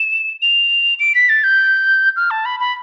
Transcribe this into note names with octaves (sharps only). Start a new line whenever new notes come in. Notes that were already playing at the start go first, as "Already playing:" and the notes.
Already playing: E7
F7
D7
B6
A6
G6
F6
A5
B5
B5